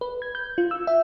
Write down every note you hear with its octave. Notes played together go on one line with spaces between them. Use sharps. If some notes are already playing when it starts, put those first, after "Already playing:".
B4
G#6
G6
F4
E6
E5